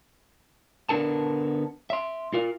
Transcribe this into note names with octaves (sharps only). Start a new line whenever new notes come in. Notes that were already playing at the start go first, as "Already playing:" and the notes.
D3 B3 D4 A#4 A5
E5 C6
F4 A#4 F5